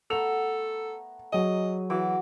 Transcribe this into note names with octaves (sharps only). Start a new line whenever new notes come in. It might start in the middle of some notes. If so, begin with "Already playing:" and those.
A3 B3 A4 A#5 F7
F#3 G#4 D#5 G#5
E3 F#4 D6